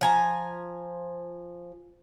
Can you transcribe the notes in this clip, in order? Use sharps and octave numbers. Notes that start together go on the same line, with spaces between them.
F3 G#5 A#5